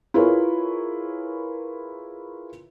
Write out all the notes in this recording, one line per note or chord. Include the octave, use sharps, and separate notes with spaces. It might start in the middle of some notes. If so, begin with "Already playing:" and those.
E4 F4 G#4 A#4 B4 C#5